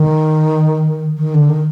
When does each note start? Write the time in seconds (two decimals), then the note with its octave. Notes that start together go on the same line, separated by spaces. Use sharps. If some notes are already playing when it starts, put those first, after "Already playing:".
Already playing: D#3
1.18 D#3
1.34 D3
1.49 D#3